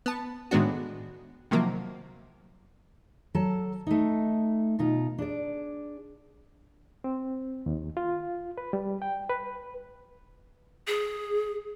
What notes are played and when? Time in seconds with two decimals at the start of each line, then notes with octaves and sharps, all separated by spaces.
0.06 B3 A5
0.51 A2 D#3 G#3 B3 D4 F#4
1.51 C3 D#3 F3 F#3 A#3
3.35 F#3 A4 A5
3.87 A3 D#4
4.79 B2 D#4 F4
5.18 D4 G#4 D5
7.04 C4
7.66 D#2
7.97 F4
8.58 B4
8.73 G3
9.02 G5
9.30 B4
10.87 G#4